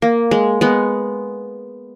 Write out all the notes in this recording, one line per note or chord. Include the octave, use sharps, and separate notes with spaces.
A#3
G#3
G#3 B3